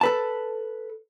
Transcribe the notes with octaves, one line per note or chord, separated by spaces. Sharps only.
A4 B4 A5